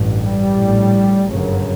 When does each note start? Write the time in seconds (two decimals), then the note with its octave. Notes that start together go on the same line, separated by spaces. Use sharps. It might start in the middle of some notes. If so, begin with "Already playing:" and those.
Already playing: A1 G2
0.18 G3
0.53 A#1 A2
1.26 G1 F#2 C#3